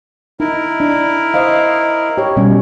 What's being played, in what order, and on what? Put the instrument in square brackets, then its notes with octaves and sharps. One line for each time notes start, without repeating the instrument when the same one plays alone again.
[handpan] D#4 [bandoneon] E4 A#4
[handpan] D4
C5 D#5 F5
G4 C#5
B2 G3 C#4